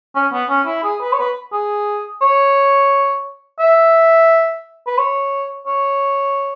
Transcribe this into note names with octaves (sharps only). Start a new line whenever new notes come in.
C#4
B3
C#4
E4
G#4
B4
C#5
B4
G#4
C#5
E5
B4
C#5
C#5